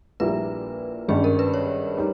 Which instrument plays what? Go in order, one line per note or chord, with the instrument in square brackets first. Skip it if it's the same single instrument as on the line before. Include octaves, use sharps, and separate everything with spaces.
[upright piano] A#1 A#2 G3 A#3 E4 [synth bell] B4
[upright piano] G#1 G2 G3 C#4 [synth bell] G#4
[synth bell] A#4
B4
C#5
[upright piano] G3 D#4